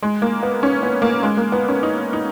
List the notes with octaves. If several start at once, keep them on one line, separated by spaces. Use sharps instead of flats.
G#3
A#3
B3
C#4
B3
A#3
G#3
A#3
B3
C#4
D#4
D#4